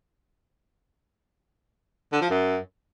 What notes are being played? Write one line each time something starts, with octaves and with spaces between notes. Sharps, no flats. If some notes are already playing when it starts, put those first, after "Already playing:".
D3
F3
F#2